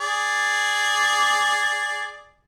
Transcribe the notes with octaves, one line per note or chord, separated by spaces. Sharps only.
G#4 D5